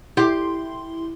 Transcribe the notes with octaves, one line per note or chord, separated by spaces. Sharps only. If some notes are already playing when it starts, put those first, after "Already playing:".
E4 G4 C6